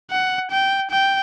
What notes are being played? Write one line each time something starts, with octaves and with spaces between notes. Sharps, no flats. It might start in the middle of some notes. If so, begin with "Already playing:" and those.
F#5
G5
G5